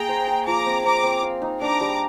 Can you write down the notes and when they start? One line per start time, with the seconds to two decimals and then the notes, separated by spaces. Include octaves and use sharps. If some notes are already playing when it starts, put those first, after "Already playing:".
Already playing: A#3 G#4 G5 A#5
0.09 C5
0.28 C5
0.46 F3 A#5 D6
0.66 C4
0.85 C4 A#5 D6
1.03 C4
1.23 F5
1.42 D#4
1.61 D4 A#5 D6
1.81 G3